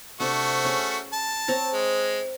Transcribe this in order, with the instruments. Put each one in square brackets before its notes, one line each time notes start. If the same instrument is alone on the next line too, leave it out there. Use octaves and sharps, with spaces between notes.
[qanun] C3 D4 [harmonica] A3 F#4
[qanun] C#4 G#4
[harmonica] A5
[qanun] C4 C#5 A#5
[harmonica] G#3